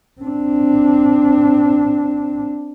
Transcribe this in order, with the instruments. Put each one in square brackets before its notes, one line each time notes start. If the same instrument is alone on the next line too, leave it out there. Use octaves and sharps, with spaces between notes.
[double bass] C4 D4